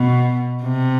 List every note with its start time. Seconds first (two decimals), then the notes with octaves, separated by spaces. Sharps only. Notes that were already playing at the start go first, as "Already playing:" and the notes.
Already playing: B2
0.63 C3